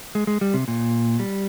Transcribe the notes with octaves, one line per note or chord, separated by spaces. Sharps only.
G#3
G#3
G3
C3
A#2
G3